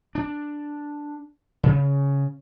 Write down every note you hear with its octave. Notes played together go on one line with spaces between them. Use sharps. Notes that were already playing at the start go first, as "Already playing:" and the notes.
D4
C#3